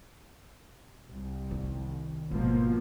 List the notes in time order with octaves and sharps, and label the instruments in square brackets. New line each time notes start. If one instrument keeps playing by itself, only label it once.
[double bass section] C2
[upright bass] D#3
[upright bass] G#1 [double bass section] B2 F3 A#3